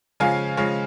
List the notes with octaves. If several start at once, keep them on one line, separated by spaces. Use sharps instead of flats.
C#3 F3 G#3 C#4 F5 G#5
C#3 F3 G#3 C#4